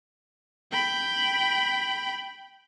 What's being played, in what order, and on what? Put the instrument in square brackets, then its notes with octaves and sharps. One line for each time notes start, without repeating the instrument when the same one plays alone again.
[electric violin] G5 B5